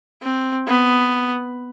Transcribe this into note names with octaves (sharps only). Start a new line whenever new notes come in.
C4
B3